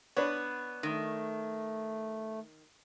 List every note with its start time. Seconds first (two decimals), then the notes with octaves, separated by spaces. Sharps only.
0.17 B3 D4 B4 C#5
0.83 D#3 A3